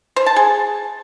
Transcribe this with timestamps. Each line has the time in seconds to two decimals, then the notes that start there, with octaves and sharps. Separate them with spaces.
0.16 C5
0.26 A5
0.36 G#4